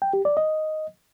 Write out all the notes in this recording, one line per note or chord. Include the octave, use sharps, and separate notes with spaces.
G5
G4
D5
D#5